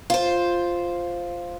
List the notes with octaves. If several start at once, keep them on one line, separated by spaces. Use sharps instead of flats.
F4 C5